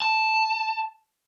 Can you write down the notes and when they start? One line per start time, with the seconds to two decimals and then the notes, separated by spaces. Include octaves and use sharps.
0.02 A5